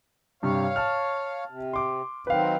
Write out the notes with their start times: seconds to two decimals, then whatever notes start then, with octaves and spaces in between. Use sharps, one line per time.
0.43 G2 C3 C#5 F5
0.76 A5 F6
1.50 C3
1.73 C6 D6
2.27 D#3 F#3 C4 B4 F5